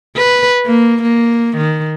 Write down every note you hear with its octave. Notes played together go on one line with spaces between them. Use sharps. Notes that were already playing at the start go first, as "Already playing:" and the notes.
B4
A#3
A#3
D#3